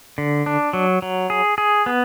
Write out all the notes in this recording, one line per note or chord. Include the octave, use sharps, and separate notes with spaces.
D3
D4
F#3
F#3
G#4
G#4
B3